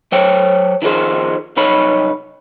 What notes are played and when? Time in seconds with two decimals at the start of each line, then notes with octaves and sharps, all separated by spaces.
0.12 F#3 C5 C#5 G5
0.82 D#3 F3 D#4 G#4 C5
1.57 C2 F#2 D#4 C#5 B5